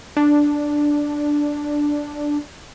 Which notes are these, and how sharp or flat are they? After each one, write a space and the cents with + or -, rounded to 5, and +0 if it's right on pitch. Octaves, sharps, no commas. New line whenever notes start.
D4 +0